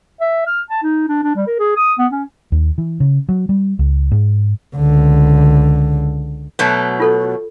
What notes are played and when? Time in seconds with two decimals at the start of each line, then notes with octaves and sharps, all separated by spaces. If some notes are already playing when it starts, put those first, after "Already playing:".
0.21 E5
0.47 F6
0.70 A5
0.83 D#4
1.08 D4
1.23 D4
1.36 G3
1.47 A#4
1.59 G#4
1.76 D#6
1.99 B3
2.12 C#4
2.52 D#2
2.78 E3
3.00 C#3
3.29 F#3
3.49 G3
3.79 C#2
4.12 G#2
4.75 C#2 D3
6.59 B2 F#3 A3
7.00 F4 A4 C#5